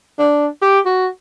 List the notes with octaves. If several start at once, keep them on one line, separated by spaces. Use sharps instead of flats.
D4
G4
F#4